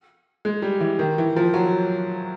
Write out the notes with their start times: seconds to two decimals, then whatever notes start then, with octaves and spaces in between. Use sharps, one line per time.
0.45 G#3
0.62 G3
0.81 E3
0.99 D#3
1.18 E3
1.36 F3
1.54 F#3